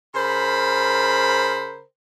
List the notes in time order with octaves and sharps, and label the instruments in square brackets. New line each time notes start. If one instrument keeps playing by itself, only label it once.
[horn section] C#3 A#4 C5 B5